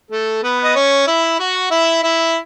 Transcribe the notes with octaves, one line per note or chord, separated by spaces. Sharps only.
A3 A4
B3 B4
D#5
C#4 C#5
E4 E5
F#4 F#5
E4 E5
E4 E5